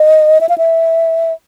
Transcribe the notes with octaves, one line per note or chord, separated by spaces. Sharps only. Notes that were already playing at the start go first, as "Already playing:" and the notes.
Already playing: D#5
E5
F5
E5